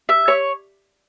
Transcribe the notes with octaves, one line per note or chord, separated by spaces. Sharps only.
E5
C#5